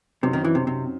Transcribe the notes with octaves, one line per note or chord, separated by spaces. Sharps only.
F#2 C3 F#3 C4 D#4
D#3
E3
C3
C3